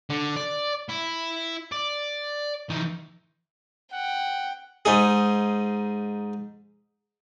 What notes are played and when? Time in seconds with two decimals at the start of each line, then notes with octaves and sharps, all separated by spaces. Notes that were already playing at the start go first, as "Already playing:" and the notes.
0.10 D3
0.36 D5
0.89 E4
1.72 D5
2.70 E3 D#4
3.93 F#5 G5
4.85 G#2 D#4 G#4